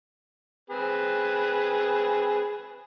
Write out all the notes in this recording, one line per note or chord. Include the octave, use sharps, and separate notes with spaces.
C4 G#4 B4